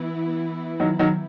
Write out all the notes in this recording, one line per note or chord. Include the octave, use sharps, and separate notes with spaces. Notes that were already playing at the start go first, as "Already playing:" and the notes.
Already playing: E3 B3 E4
D#3 F#3
D#3 F#3